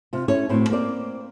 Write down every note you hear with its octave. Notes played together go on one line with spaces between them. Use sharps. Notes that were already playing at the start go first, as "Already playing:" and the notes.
C3 F4
C#4 E4 A4 C#5
A2 B3 C4 F#4
A#3 C4 D5